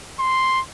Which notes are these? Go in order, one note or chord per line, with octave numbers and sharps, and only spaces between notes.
C6